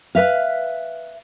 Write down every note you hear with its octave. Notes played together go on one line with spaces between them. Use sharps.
B4 E5 F5